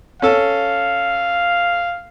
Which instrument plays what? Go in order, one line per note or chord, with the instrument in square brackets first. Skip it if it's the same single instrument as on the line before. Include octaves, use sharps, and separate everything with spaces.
[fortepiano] C#4 A4 [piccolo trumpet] F5